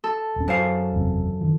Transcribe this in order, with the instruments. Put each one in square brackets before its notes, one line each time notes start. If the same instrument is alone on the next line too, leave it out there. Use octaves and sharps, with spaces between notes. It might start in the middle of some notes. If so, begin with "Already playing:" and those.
[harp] A4
[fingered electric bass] D#1 C#4
[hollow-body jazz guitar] F#2 C5 F5 [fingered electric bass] C#4
[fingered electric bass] F#1 E2 C3
D#3 F3